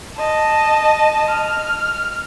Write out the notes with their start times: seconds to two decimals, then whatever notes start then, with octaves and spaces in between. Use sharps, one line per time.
0.18 D#5 A5
1.31 F6